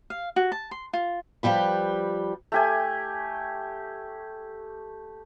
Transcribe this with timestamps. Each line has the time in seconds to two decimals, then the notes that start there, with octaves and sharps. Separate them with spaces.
0.10 F5
0.36 F#4
0.52 A5
0.71 C6
0.93 F4
1.43 F3 G3 G4 B4
2.52 A3 G4 G#5